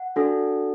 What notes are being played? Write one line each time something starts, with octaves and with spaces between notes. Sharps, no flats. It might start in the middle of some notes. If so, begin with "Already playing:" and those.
Already playing: F#5
D4 F#4 A4